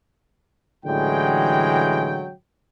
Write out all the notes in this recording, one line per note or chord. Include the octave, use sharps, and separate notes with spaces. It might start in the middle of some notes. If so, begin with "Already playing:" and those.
A1 D3 E3 F#3 G#3 G5